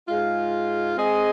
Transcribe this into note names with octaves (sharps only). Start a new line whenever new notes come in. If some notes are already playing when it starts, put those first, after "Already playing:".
G#2 G#3 F4
G#3 C4 G#4 D#5